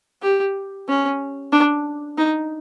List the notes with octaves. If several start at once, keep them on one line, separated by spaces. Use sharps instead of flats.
G4
C#4
D4
D#4